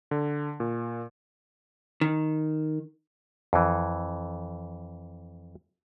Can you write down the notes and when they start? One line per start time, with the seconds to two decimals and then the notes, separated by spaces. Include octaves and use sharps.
0.11 D3
0.60 A#2
2.01 D#3
3.53 F2 E3